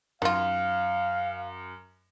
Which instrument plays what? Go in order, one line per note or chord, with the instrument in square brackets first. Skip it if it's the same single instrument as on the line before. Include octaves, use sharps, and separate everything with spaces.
[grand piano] F#2 [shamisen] D#3 F4 [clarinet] F5